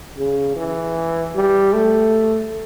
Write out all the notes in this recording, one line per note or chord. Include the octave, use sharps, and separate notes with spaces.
C#3
E3
G3
A3